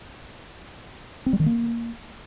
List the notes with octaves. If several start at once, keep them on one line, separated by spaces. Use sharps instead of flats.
C4
G3
D#3
A#3